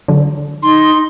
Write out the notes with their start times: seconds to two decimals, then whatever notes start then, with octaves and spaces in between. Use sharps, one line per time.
0.08 D3 F#3
0.63 D#4 C6